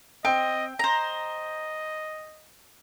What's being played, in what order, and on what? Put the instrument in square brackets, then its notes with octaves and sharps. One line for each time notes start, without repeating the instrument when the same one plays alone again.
[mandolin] C4 [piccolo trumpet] D#5 [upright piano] G5
[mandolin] C5 A#5 [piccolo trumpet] D#5